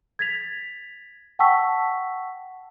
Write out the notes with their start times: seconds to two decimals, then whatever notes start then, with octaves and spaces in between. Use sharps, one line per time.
0.19 G#6 A6 B6 F7
1.39 F#5 G5 A5 C#6 E6 B6